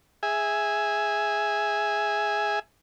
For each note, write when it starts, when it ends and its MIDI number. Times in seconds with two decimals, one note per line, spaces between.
0.23 2.59 68
0.23 2.59 76
0.23 2.59 80